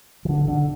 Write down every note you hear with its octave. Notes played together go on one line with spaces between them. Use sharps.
E3
D3
D3